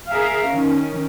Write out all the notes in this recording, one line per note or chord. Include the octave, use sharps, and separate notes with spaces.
G#4 A#4 E5 F5
D#3 C#4